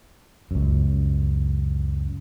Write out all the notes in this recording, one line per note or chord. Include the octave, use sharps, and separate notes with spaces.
C#2 F#2